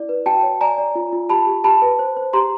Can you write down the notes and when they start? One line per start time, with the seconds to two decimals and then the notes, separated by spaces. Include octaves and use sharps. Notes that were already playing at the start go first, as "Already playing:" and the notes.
Already playing: E4 D5
0.09 B4
0.26 F#4 G5 A5
0.43 C#5
0.61 D5 G#5 A#5
0.78 D5
0.95 F4
1.13 F4
1.30 G4 A5 B5
1.47 G4
1.64 G4 A5 B5
1.82 B4
1.99 C5
2.17 C5
2.33 G4 A#5 C6